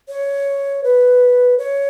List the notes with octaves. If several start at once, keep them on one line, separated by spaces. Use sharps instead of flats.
C#5
B4
C#5